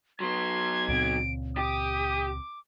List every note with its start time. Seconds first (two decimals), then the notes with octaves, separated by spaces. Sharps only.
0.20 F#3 B3 C6 G#6
0.89 C#2 A#2 C4 D7
1.57 G4 D6 D#6